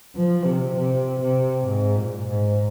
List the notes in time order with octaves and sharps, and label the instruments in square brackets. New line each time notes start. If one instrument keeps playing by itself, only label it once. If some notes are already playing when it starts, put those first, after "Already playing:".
[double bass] F3
C3
C3
C3
G#2
A#2
G#2